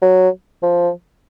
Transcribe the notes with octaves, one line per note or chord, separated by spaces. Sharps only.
F#3
F3